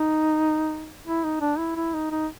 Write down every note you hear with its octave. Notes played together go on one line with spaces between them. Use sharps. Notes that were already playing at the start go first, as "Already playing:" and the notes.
Already playing: D#4
E4
D#4
D4
E4
E4
D#4
D#4